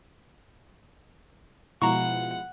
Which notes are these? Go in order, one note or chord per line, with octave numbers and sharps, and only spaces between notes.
B2 F3 G#3 E4 F4 F#5 A#5 C#6